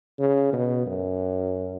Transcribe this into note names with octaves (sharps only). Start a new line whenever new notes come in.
C#3
B2
F#2